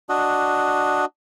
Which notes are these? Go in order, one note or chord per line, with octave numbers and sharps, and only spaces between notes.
D4 F#4 D#5